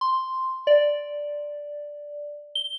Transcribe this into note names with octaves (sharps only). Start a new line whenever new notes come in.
C6
D5
G7